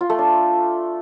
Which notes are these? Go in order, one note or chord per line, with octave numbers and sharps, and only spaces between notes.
F4
A3
D4